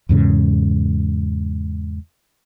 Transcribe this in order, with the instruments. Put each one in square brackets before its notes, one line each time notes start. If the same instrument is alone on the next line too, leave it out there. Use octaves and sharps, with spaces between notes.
[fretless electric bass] E2 G#2 C#3